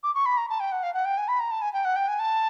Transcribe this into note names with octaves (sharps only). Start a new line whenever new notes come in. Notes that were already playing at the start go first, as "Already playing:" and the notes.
D6
C#6
B5
A#5
A5
G5
F#5
F5
F#5
G5
G#5
B5
A#5
A5
G#5
G5
F#5
G5
G#5
A5